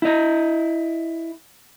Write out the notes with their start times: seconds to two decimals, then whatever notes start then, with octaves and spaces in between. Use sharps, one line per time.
0.02 E4 D#5